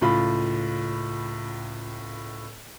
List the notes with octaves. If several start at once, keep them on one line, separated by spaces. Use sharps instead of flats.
C#2 A2 F4 B5